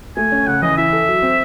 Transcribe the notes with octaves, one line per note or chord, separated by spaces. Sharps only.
A3 G#5
C#4
C#3 F#5
E3 D#5
E4 E5
A4
F#3
C4